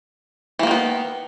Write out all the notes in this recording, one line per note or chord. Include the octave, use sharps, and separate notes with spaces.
D#3 E3 A#3 B3